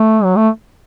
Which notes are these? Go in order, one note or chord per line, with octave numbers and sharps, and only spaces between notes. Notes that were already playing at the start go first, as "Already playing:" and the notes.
Already playing: A3
F#3
A3